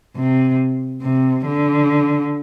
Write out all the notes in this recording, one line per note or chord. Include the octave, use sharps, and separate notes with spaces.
C3
C3
D3